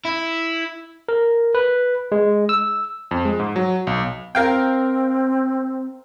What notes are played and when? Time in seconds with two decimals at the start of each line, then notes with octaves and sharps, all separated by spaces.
0.05 E4
1.09 A#4
1.55 B4
2.12 G#3
2.49 E6
3.11 F2
3.25 G#3
3.39 G#2
3.56 F#3
3.87 B1
4.35 C4 A#4 F5 G5